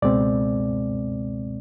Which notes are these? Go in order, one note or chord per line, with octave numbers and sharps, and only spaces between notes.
C#2 B2 G#3 C4 D5